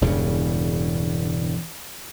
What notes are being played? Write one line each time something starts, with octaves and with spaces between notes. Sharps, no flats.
E1 E2 G2 C#3